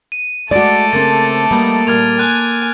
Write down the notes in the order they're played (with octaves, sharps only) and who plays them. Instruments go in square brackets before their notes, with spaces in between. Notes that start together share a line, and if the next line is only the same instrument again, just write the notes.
[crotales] D#7
[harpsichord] G#3 [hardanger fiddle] A3 A4 [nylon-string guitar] F#4 D5 [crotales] D6 A6 D7
[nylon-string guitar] C#3 C4 [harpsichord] A#3 [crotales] A6
[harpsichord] G3 B3 D#4 [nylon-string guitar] A#3
[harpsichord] A#2 G3 [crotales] F6 G#6 F7
[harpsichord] F4 A5 D6 [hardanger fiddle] G#5 [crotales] F#6